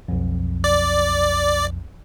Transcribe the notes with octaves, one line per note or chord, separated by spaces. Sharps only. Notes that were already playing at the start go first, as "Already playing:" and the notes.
B1 F2
D5